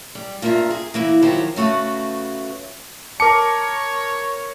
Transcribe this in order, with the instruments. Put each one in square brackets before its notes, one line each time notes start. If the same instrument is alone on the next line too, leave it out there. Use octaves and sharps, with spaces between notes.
[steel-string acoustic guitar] G3
G2 A#3 F4 E5 A#5
G#4
E3 A#3 E4
D#3 F3 F#3 G4 C5 C#5
C#3 A3 F#4 B4
[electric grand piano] A#4 C#7 [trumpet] C#5 [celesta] A5 D6